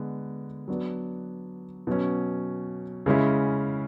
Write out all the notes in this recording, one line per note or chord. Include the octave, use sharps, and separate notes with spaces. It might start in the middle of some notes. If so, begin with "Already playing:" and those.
Already playing: D3 G#3 B3
F#3 B3 D4
B2 F#3 C#4
C#3 G#3 C#4 E4